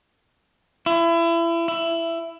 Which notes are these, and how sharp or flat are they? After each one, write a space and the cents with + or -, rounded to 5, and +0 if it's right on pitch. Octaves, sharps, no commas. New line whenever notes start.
E4 +30
E4 +15